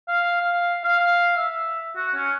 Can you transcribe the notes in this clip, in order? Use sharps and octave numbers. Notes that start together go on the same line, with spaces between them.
F5
F5
F5
E5
F#4
C#4